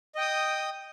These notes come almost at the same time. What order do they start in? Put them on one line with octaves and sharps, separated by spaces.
D#5 G5 D#6